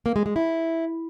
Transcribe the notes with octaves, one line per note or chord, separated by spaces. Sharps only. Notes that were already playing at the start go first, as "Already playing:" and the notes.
A#3
G#3
G#3
E4